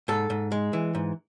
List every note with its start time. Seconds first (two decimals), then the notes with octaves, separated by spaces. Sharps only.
0.08 G#2 A4
0.30 G#2
0.52 G#3
0.73 E3
0.95 G#2